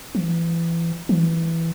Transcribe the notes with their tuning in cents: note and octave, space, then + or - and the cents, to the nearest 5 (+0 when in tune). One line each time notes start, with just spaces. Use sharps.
E3 +25
E3 +0